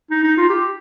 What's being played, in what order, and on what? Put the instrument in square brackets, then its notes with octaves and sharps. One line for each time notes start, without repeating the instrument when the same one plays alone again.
[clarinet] D#4
D#4
F4
G4